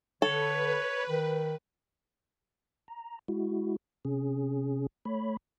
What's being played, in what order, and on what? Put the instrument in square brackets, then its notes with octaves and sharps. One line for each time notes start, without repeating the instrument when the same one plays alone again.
[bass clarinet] D3 [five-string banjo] A4 [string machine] B4 [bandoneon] C#5
[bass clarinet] D#3
[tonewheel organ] A#5
G#3 E4 F#4
C3 C#4 G#4
A3 C#5 B5